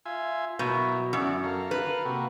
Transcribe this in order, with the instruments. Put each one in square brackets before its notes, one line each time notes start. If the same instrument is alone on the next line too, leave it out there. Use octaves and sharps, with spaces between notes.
[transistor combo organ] F4 E5 G#5
[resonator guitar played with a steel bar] B2 [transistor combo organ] F#3 E4 A#4
[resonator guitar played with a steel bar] F#2 [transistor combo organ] E4 F#4 D5
[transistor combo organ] A4 A#4 F5
[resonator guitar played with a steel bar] B4
[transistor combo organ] C3 A#3 F#4